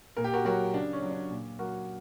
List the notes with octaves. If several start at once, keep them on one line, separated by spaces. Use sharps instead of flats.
A#2 A#4
G4
F#4 A#4
F#3 F#4 A#4
C#3 D4
C#4
F#3
D4
A#2
F#3 F#4 A#4